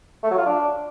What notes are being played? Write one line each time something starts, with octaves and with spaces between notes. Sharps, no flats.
A3
F#3
F4
D4